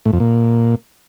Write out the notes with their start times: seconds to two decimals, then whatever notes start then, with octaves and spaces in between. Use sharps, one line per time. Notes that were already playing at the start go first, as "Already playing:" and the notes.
0.05 A2
0.13 F2
0.20 A#2